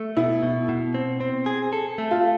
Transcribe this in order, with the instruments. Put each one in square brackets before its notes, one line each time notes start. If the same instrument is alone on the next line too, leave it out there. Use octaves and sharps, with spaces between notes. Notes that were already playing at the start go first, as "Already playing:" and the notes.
Already playing: [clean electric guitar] A3
[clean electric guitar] B2 [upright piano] E4
[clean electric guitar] B2
B2
C4
C4
G#4
A4
A3
[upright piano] F4